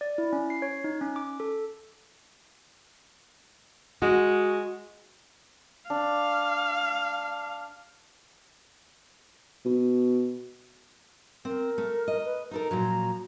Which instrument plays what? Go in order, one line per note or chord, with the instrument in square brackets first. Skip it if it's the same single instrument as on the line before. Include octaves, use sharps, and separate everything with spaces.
[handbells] D5
E4
C#4
C7
C#5
D#4
C#4
D6
A4
[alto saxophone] G#3 [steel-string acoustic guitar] F#4
[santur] D4 [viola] F5
[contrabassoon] B2
[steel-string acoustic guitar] C4 [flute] A#4
[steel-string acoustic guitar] A3
D#5
[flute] B4
[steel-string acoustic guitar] D#4 A4 A#4 [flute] A#5
[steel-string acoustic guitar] A#2 F3 F#3